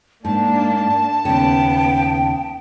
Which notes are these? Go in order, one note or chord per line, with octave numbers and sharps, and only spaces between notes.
G#2 A#3 D4 A5
D#2 C#3 B3 G5